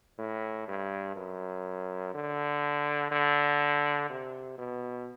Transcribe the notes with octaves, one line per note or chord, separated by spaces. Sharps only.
A2
G2
F#2
D3
D3
C3
B2